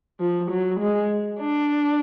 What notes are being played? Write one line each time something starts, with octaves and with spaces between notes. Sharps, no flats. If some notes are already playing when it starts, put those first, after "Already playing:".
F3
F#3
G#3
D4